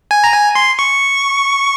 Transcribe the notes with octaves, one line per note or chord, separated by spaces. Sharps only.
G#5
A#5
G#5
C6
C#6